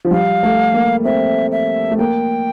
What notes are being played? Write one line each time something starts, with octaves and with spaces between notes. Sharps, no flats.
F3
G3 F5
A3
A#3
C4 E5
E5
A3
A#3 G5